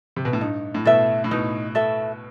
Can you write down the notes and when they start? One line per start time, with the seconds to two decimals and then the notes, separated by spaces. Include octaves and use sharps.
0.16 C3
0.25 B2
0.33 A2
0.40 G2 D#4
0.75 A2
0.85 B2 A4 E5
1.24 A2
1.31 B2 D#4
1.75 A4 E5